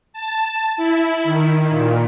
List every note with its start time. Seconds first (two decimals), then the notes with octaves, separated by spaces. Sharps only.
0.13 A5
0.77 E4
1.24 D#3
1.69 A#2